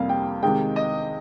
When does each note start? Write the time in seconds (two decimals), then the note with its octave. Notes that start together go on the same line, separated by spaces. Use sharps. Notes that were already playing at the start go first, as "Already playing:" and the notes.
Already playing: F2 C3 G3 A#3 F5
0.09 G5
0.43 C3 D#3 G#3 G5
0.76 D#5